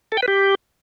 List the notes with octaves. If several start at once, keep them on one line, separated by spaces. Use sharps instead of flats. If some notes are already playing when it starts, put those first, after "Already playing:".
A4
G5
B4
G4